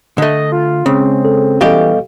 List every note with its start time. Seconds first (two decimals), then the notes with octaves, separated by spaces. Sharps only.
0.18 D3 A3 D#5
0.52 F4
0.86 C#3 G#3 C4 C#4
1.25 A4
1.61 B2 E3 G3 G4 A4 D#5 F5